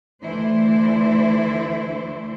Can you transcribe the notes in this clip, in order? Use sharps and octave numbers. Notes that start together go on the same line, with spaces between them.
D2 E3 A3 D4 E4 C5